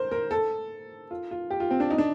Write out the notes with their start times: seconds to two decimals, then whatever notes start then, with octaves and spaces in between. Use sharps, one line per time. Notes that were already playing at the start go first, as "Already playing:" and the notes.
Already playing: A#4 C5
0.11 A#4
0.31 A4
1.11 F4
1.31 F4
1.50 G4
1.60 F4
1.71 C4
1.80 D4
1.90 D#4
1.98 D4